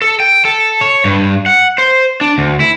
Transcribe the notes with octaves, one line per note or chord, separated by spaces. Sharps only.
A4
G5
A4
C#5
G2
F#5
C5
D4
D2
E4